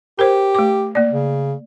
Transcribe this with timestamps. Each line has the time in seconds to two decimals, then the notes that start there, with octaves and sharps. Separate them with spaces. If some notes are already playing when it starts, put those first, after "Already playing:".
0.19 G4 A#4 C5
0.55 A3 D6
0.95 A#3 D5
1.13 C#3